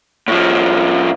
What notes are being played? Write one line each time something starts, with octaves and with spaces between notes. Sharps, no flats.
A2 F3